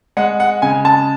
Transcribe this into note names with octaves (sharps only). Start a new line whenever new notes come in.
G#3 F#5
F#5
C#3 G#5
A5